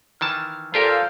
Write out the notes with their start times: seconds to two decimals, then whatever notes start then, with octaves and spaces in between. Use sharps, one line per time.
0.21 D#3 E3 A5 F6
0.74 A#2 F4 G4 A4 A#4 C5 F5